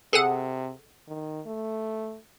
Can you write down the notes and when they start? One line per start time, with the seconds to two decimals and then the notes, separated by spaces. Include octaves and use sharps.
0.13 C3 G#4 A4 F#5
1.08 D#3
1.46 A3